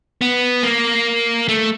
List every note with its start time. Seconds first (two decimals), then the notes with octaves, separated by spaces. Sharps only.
0.21 B3
0.63 A#3
1.48 A3